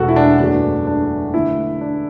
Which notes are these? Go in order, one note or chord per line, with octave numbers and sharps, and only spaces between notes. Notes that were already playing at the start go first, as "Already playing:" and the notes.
Already playing: E1 E2 B2 A3 F#4 A4
E4
D4
F#1 E2 B2 F#3 A3 D4
D4
D2 D3 A3 E4
D4